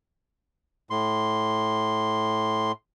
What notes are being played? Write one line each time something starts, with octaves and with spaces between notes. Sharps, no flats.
A2 C6